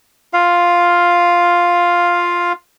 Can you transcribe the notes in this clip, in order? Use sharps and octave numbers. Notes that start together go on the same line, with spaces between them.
F4 F5